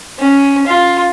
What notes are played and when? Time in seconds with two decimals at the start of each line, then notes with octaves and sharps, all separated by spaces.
0.19 C#4
0.67 F4